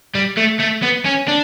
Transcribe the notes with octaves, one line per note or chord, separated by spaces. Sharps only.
G3
A3
A3
B3
C#4
D4